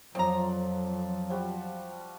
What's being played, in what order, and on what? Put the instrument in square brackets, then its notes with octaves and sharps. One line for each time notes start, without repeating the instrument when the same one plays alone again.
[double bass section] F2 [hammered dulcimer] F3 D5 [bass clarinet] F#3 [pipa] C4 A#5
[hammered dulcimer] F3 G3 F#4